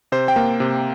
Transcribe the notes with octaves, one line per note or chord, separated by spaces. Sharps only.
C3 C5
G5
A#3
C3